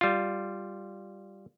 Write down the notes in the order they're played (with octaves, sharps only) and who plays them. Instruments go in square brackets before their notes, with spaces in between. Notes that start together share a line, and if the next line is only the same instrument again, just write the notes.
[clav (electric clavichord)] G3 F4